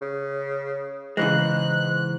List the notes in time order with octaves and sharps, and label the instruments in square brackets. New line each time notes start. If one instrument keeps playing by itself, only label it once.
[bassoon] C#3
[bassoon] G#2 [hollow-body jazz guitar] C#3 E3 G#3 [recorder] F#6